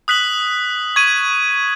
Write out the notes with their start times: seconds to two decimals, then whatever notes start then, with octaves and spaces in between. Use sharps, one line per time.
0.08 D#6 F#6 B6 F#7
0.96 C#6 G#6 D#7 F#7